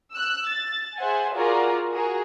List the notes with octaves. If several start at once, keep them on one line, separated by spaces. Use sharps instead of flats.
E6 F#6
A6
G#4 C5 E5 F#5 G#5
F4 F#4 G#4 A#4 D5
F#4 G#4 A#4